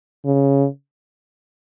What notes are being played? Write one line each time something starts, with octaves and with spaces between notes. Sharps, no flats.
C#3